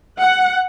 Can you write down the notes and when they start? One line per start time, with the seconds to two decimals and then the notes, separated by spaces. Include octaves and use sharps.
0.23 F#5